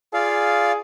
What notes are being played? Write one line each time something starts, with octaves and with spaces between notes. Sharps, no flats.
F4 G#4 D5 F5